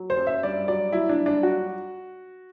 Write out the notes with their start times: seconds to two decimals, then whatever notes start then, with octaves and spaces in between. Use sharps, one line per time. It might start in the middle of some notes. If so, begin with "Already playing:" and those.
Already playing: F#3
0.10 C5
0.17 F#2
0.27 E5
0.43 G2 D5
0.68 F#3 D5
0.92 F#3 E4
1.09 D4
1.19 G2
1.26 D4
1.43 F#3 F#4